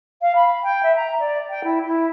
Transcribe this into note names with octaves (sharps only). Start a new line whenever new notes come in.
F5
B5
G5
E5
A#5
D5
G5
E4
E4